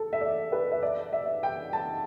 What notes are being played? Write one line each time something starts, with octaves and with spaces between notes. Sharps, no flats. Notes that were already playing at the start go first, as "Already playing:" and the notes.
Already playing: A4
E5
D5
B4
E5
D5
E5
G5
A5